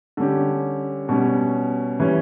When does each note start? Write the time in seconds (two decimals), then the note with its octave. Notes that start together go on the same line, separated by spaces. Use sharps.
0.17 D3 G3 C#4 G4
1.09 B2 G3 C#4
2.00 E3 G3 C#4